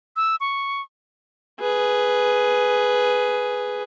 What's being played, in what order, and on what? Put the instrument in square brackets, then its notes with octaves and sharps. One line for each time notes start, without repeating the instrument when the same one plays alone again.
[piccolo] E6
C#6
[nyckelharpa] G#4 B4